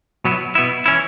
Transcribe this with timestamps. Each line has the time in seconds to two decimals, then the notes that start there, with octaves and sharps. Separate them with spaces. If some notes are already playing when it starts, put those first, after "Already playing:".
0.25 B2 F#3 B3 E4
0.55 B2 B3 E4
0.86 E3 C#4 E4